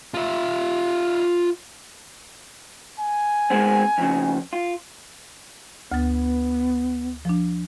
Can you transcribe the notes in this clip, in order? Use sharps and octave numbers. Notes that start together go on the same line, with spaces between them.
F4 E5
G#5
G#3 B3 C4
F2 C#3
F4
D2 B3 A6
F3 D4